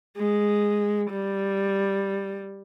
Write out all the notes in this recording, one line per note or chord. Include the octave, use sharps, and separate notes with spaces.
G#3
G3